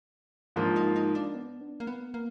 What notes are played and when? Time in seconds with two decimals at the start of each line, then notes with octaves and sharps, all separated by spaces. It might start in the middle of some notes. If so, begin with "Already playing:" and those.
0.56 G#2 F3 A#3 D4 F4
0.76 D#4
0.96 D#4
1.15 D4
1.35 B3
1.61 D4
1.80 A#3
1.87 B3
2.14 A#3